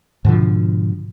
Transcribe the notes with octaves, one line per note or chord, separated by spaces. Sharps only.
G#2 B2 D3 F3